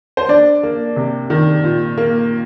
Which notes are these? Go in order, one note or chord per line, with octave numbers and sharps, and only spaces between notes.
C5
D4 D5
A#3
C3
D#3
A#2
A#3